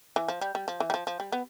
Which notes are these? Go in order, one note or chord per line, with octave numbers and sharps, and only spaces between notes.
E3
F3
G3
G3
F3
E3
G3
F3
F3
G3
B3